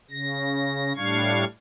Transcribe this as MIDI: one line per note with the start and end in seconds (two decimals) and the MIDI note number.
0.11 0.93 49
0.11 0.93 94
0.97 1.45 45
0.97 1.45 55
0.97 1.45 62
0.97 1.45 77
0.97 1.45 85
0.97 1.45 92